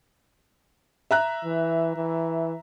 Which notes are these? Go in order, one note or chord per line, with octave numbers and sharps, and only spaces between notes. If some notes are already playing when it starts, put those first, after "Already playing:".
E5 A#5 F#6
E3
E3